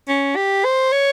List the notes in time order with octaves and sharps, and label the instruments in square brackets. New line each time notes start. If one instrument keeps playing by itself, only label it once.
[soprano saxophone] C#4
G4
C5
C#5